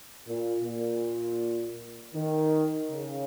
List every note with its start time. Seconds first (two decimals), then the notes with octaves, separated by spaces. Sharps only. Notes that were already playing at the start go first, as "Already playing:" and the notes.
0.26 A#2
0.64 A#2
2.15 D#3
2.90 C#3